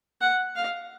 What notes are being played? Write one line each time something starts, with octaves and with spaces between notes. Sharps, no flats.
F#5
F5